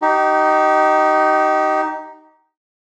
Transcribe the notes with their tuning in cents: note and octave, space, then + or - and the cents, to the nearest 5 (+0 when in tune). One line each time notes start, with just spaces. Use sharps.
D#4 +0 G4 -30